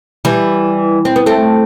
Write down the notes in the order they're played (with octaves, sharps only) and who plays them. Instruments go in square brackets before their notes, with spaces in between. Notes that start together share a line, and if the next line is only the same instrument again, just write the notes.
[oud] E3 G3
C4
B3
A3 C4